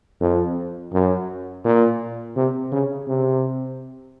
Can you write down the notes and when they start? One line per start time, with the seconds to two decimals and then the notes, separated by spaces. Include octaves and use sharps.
0.21 F2
0.93 F#2
1.65 A#2
2.36 C3
2.72 C#3
3.08 C3